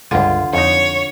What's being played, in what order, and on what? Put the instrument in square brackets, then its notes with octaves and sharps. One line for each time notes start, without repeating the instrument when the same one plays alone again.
[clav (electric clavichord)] C#2 G2 G#5 [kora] D3 F4
[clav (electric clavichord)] F2 D#4 [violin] C#5